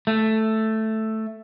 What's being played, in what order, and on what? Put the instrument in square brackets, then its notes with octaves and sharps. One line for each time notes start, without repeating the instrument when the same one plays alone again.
[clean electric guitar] A3